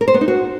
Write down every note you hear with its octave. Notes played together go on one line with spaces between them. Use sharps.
A#4
C5
B3
D#4
F#4